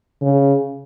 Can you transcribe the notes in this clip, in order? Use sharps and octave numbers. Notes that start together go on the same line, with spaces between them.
C#3